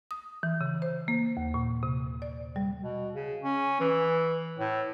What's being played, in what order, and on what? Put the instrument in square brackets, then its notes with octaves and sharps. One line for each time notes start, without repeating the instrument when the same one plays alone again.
[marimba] D#6
E3
C#3
C5
A#3
D#2
A#2
C3
D5
G3
[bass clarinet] B2
C#3
C#4
E3
A2